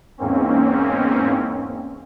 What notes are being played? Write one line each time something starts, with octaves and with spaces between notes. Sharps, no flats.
E2 G#2 A#3 C4 C#4